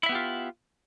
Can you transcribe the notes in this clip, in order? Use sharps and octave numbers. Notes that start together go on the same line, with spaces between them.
B3 E4 F4 G4 E5